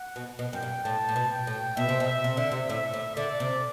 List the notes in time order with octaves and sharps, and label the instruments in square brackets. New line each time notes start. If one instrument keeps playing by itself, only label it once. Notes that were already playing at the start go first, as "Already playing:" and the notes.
Already playing: [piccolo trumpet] F#5
[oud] B2
B2
[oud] F#2 [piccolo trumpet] G5
[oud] G2
[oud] A2 [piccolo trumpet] A5
[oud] A2
B2
[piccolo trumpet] G5
[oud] A2
[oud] B2 [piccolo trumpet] E5
[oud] C3
B2
[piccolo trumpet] E5
[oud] C3
[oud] D3 [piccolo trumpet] E5
[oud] C3
[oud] A2 [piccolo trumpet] E5
[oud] A2
[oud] D3 [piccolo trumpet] D5
[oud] C3